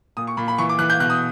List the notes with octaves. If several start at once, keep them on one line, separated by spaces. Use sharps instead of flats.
A#2 D#6
C#6
A#2 B5
B5
E3 C#6
D6
E3 F#6
G6
B2 F#6
D#6